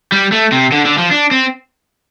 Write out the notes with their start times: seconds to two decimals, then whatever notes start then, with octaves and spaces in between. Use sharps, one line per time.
0.12 G3
0.32 A3
0.52 C3
0.72 D3
0.85 D3
0.98 F3
1.11 D4
1.31 C4